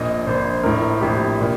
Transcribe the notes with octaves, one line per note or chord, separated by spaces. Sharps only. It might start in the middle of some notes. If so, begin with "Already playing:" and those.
Already playing: A#1 A#2 D#5
A#1 A#2 C5
A#1 A2 A#4
A#1 A2 G4
A#2